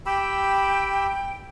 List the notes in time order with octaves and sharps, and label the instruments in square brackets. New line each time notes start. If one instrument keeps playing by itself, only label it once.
[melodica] G4 B5 E6 [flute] G5